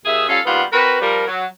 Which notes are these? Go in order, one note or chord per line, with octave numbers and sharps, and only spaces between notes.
D#2 G#4 E5
G3 C#4 F4 A4 F5
D#2 G3 B3 F4 F#4 F#5
C4 F#4 A#4 B4
F3 G3 A#4
F#3